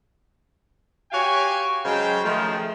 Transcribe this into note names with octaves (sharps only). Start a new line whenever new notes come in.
F#4 G4 C#5 F5 G5 G#5
C#3 F#3 G#3 C5 F5 G5
D#3 F3 G#3 A3 F4